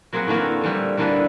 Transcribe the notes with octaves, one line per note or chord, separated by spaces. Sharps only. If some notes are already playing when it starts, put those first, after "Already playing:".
F#3 A#3 C4 G#4 B4 F#5
A2 D3 E3 A#3 F#4
D3 E3 G3
D3 E3 A#3 B3 D4 B4